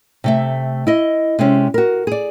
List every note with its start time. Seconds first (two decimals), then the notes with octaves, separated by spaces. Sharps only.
0.24 C3 A3 E5
0.87 E4 D#5
1.39 C3 G#3 C4 C#4
1.74 F#4 A#4
2.07 G#4 D5